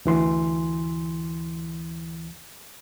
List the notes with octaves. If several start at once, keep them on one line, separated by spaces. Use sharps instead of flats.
D2 E3 C6